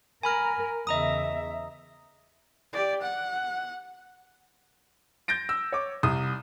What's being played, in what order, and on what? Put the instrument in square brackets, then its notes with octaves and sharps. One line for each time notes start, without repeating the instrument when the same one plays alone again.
[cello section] A#4 [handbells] G#5 B5 F6
[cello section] E2 C#3 E5 [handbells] D#5 A#5 D#6
[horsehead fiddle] G4 D5
F#5
[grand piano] G6 A6 A#6 D7
E6
C#5 D6
C2 D#6